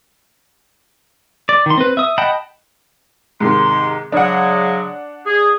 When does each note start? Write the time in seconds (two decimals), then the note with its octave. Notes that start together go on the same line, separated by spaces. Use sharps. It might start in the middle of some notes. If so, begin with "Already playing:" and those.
1.49 D5
1.66 D#3 C6
1.78 C4 B4
1.97 E5 D#6
2.18 D#5 F#5 G5 A5 B5
3.40 G#2 C3 D#3 C6
4.12 C#3 F#3 G#3 D4 F#5
5.26 G#4